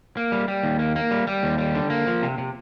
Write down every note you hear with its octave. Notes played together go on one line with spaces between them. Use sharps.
A#3
G3
G3
D#2
A#3
A#3
G3
G3
D#2
G3
D3
A#3
F3
C3
C3